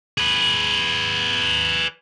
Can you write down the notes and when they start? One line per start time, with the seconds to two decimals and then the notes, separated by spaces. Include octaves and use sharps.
0.18 G#4 B4